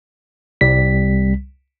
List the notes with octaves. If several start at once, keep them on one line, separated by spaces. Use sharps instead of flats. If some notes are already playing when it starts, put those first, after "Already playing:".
C2 G3 B6